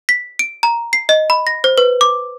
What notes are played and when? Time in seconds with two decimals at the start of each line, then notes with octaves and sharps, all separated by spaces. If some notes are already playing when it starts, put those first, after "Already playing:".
0.09 B6
0.39 D7
0.63 A#5
0.93 C7
1.09 D#5
1.30 B5
1.47 A#6
1.64 C5
1.78 B4
2.01 D6